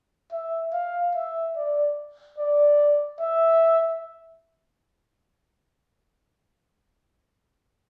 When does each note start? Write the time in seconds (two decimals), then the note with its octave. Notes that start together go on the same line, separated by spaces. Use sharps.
0.32 E5
0.73 F5
1.15 E5
1.56 D5
2.38 D5
3.20 E5